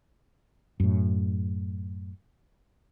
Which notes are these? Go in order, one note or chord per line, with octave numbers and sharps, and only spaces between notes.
F#2 A2